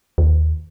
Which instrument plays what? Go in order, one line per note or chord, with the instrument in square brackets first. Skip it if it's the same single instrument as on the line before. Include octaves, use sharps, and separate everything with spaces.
[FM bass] D#2